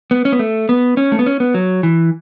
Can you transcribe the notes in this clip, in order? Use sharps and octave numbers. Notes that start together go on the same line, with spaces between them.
B3
C#4
B3
A3
B3
C#4
A3
B3
C#4
B3
F#3
E3